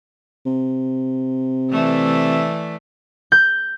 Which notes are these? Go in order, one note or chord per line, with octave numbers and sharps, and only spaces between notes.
C3
E3 A3 D5
G6